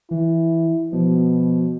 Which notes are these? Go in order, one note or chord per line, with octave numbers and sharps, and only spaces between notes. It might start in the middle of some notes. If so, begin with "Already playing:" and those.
E3 E4
B2 F3